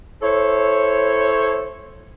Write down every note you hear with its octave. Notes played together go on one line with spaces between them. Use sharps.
E4 A4 C5 C#5